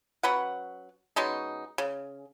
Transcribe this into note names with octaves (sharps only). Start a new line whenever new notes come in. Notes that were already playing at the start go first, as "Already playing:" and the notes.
F#3 C#4 B4 F#5
B2 G#3 C#4 D#4
C#3